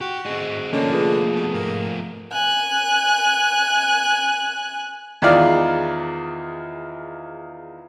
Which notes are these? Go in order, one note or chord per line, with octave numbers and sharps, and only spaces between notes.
F#4 G4
G#2 A3 C4 G#4 D#5
D3 F3 A3 A#3 C#4 A#4 D#5
F4 G#4 B4
B2
G#2 A#3
G#5 F#6
E2 D#3 G#3 F4 D5 F5